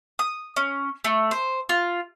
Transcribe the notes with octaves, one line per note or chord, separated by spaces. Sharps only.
D#6
C#4
A3
C5
F4